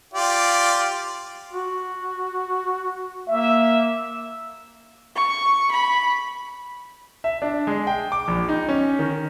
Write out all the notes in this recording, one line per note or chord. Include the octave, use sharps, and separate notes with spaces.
F4 G4 D5
F#4
A#3 E5
C#6
B5
E5
D4
G#3
G5
D6
A#1
D#4
C#4
D#3